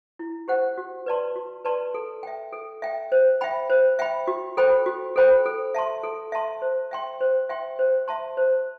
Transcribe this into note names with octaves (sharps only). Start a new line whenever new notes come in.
E4
G4 C5 F#5
F#4
B4 D5 A5 C6
F#4
B4 D5 A5 C6
A4
E5 G5
A4
E5 G5
C5
E5 G5 B5
C5
E5 G5 B5
F#4
A4 C5 G5 B5
F#4
A4 C5 G5 B5
A4
E5 A5 C6
A4
E5 A5 C6
C5
E5 G5 C6
C5
E5 G5 C6
C5
E5 A5 C6
C5